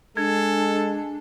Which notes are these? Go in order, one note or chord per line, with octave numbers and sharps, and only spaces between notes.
G#3 D4 A4 G#6